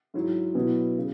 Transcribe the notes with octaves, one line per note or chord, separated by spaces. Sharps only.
G#2 F#3 E4
B2 F#3 E4
C#3